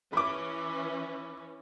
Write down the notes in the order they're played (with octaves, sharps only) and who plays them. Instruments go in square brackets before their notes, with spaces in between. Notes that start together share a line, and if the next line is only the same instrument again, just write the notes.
[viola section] E3 C#4 [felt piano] B5 D6